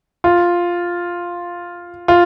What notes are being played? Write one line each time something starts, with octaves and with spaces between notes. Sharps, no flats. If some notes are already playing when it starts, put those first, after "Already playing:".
F4
F4